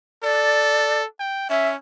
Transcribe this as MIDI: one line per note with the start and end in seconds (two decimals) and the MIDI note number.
0.23 1.05 69
0.23 1.01 74
1.20 1.48 79
1.50 1.76 61
1.50 1.68 76